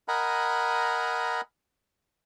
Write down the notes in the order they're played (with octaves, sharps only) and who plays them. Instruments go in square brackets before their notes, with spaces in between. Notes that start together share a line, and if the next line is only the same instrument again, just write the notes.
[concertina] A#4 D#5 F#5 G#5 A#5 B5